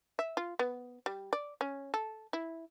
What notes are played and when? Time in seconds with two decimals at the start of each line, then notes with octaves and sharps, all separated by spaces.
0.19 E5
0.37 F4
0.59 B3
1.06 G3
1.33 D5
1.61 C#4
1.94 A4
2.33 E4